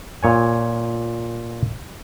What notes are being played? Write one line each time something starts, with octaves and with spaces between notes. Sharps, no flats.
A#2 C#5 G#5